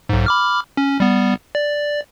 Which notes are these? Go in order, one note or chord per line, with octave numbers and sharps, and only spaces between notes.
B1 G#2
B5 D6 F6
C#4
G3 B3
D5